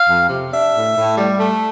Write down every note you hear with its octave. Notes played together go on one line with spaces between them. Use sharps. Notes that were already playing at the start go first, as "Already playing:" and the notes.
Already playing: F5
F2
C3
D4 E5
A2
A2
G3
A3